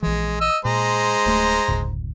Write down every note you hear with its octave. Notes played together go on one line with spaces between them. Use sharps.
A#1 E3 G#3
D#5 E6
A#2 G#3 C5 A#5
D1 A3
F#1 D2 A2